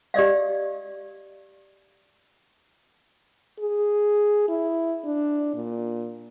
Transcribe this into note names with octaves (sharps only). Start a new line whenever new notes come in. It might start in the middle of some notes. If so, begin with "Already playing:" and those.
G4 D5 D#5 F5
G#4
E4
D4
A#2